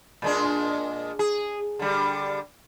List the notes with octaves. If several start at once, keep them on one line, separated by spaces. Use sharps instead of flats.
A#2 G#3 D4
G#4
D3 G3